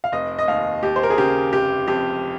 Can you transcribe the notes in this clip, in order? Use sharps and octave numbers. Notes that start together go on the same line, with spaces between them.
F5
F1 D#5
D#5
D#2 F5
D#2 G4
C5
A#4
G#4
C#3 G4
F1 G4
F2 G4